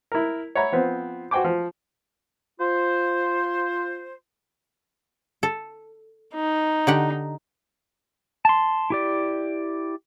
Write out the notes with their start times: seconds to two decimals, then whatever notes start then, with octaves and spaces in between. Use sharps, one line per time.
0.12 E4 A#4
0.55 C#5 E5 F#5 A#5 B5
0.72 F3 B3 C4
1.31 F#4 C5 G5 G#5 D6
1.44 F3
2.59 F4 C5
5.43 A4
6.35 D#4
6.87 D3 G4 F#5
8.45 A5 C6
8.90 E4 G4 D5